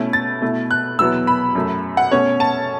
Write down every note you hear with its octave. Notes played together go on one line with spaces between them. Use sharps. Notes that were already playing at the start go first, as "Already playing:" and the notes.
Already playing: B2 A3 C#4 E4
A6
B2 A3 E4
F#6
E2 B2 F#3 B3 E4 E6
B5
F#2 F#3 A3
F#5
B2 A3 C#4 C#5
A5